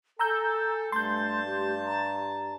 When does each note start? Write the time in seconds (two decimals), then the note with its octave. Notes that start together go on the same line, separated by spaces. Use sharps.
0.19 A4 G#5 A#5 E6 G6
0.92 G2 A3 A5 C6 G6
1.46 G4
1.84 A#5